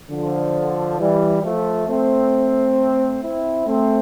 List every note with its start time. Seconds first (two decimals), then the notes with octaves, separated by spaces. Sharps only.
0.10 D3 F3
1.00 E3 G3
1.44 F3 A3
1.88 A3 C4
3.22 C4 E4
3.67 A3 C4